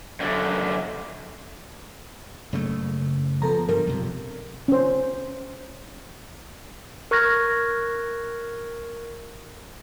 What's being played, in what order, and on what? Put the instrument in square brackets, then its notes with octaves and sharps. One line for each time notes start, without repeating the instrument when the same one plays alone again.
[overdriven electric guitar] F#2 D3
[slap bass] F#1 C#3 A3
[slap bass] F3 [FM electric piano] B3 A4 A#5
[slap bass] G2 F3 G3 [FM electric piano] A#4
[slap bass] B1 F2 C3
[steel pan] C#4 C5
[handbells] A#4 C#6 F6 F#6 G#6 A#6